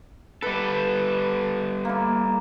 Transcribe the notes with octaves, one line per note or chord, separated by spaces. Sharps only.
G3 A4 B4
A#3 E4